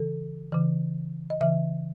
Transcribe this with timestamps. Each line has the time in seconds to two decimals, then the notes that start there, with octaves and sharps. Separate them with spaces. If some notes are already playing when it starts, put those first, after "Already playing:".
Already playing: C#3 E3 A4
0.52 C#3 E3
1.30 D#5
1.40 C#3 E3 E5